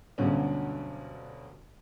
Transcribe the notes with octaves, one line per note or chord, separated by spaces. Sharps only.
D2 G2 B2 D3 F#3 C#4